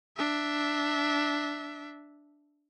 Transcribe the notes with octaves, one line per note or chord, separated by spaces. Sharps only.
D4 E5